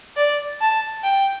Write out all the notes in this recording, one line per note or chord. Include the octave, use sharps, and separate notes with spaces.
D5
A5
G5